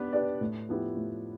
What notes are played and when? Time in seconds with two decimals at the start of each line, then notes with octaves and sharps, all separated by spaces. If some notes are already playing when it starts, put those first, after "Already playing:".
Already playing: B3 D4 G4 B4
0.12 D4 G4 B4 D5
0.41 A2
0.69 F3 B3 E4 G4
0.97 A2